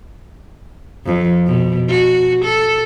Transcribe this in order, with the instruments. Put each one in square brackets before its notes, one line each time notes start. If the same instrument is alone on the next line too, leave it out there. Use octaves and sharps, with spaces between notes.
[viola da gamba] F2
B2
F#4
A4